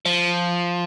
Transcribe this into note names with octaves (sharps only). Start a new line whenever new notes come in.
F3